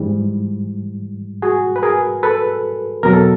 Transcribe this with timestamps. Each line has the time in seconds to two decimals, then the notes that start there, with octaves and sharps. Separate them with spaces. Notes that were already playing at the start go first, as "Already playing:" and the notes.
Already playing: G#2 E3 G3
1.42 F#4 G#4
1.76 B4
1.83 G#4 A#4
2.23 A4 B4
3.03 E2 B2 F#3 A#4
3.13 A4